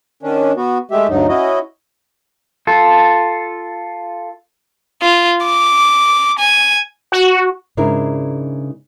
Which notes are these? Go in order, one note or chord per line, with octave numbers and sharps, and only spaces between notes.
D#3 C#4 D4
B3 F#4
G#3 A3 G4 E5
D2 G2 F#3 D#4
C#4 E4 F#4 D#5
F4 A4
F4
D6
G#5
F#4
G#2 C#3 D4 E4 A#4